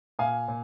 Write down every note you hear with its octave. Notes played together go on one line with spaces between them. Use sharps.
A#2 F5 G#5
A#2